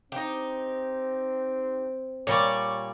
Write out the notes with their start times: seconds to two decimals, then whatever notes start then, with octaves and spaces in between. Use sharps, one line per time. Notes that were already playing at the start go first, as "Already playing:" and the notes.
0.12 C4 D#4 G4
2.27 A#2 G3 C#5 D5